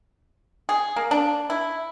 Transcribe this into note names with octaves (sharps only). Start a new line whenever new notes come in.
G#4
A#3
D4
E4